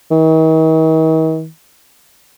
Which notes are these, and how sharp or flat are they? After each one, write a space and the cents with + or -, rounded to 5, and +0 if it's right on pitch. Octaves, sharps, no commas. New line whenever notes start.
D#3 +45